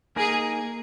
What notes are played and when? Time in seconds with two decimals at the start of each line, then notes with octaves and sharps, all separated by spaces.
0.16 A#3 D#4 G#4 A#4